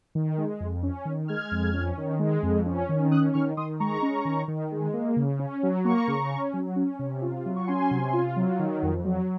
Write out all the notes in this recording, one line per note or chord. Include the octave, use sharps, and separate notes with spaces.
D#3
G#3
F2
C#4
D#3
G#3 F6 G#6
F2
C#4
D#3
G#3
F2
C#4
D#3
C#4 D#6 F#6
D#3 C#6 F6
D#3 C6 D#6
G#3 A#5 C#6
C#4
D#3
D#3
G#3
A#3
C#3
C#4
F#3
A#3 A#5 C#6
C#3
C#4
F#3
C#4
C3
F4
F#3
C#6
C#4 G#5 C6
C3
F4
F#3
D#3
F2
F#3